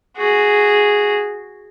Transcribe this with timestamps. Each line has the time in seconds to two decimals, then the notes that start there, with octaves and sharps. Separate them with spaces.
0.17 F#4 G#4